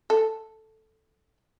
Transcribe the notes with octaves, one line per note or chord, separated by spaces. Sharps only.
A4